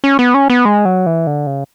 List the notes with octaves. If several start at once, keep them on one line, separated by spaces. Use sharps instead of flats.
C#4
B3
C#4
B3
G#3
F#3
E3
D3
C#3